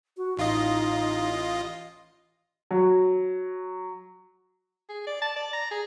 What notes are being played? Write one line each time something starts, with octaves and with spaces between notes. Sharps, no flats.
F#4
A1 D#4 F4 D#5
F#3
G#4
D5
A5
D5
A#5
G#4